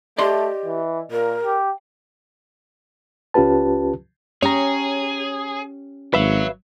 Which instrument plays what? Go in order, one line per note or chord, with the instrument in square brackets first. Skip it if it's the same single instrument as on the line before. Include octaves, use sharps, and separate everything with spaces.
[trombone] A3 [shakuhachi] G4 [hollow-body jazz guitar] D5 D#5 C6
[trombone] E3
[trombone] A#2 [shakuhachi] A#4
[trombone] G4
[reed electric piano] C#2 C#4 F4 G4 B4 A5
[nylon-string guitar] C#4 G4 [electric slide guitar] G#4 [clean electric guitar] C#5 A#5
[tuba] G#1 [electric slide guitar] F#3 [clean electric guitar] B4 E5 F5